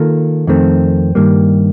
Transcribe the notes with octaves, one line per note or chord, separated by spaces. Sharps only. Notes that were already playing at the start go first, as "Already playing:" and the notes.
Already playing: D#3 A#3 F4 A4
F2 D#3 A3 C4
G2 D#3 G3 A#3